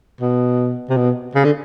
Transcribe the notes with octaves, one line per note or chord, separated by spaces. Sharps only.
B2
C3
B2
C#3
D3